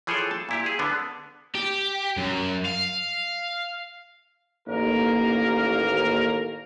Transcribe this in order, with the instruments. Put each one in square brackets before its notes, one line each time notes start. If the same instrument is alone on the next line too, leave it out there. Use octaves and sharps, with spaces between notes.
[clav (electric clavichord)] E3 F3 G#4 A4 C#5 G5
A5
A#2 E4 G4
G#4
D3 B3 D4
[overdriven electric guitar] G4
F#2
F5
[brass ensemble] A1 D#2 A#3 A#4